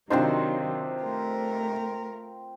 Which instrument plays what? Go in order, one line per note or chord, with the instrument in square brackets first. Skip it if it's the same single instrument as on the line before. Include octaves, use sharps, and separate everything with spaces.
[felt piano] C3 D4 D#4 [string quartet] D#3 F#3 [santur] C4 F4 C5
[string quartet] A3 A#4